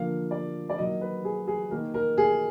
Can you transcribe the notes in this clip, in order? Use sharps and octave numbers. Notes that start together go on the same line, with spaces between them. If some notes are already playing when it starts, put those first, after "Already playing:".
Already playing: D3 F3 A#3 F5
D5
D5
D#3 F#3 A#3 D#5
B4
G#4
G#4
D#3 A#3 A#4
A#4
G#4